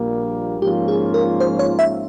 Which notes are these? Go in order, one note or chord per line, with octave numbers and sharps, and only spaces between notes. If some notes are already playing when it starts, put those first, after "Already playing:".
Already playing: A#1 A#2 G3 A#3
G#2 F3 A#3 C#4 F4 G4
G#4
A#4
C5
C#5
E5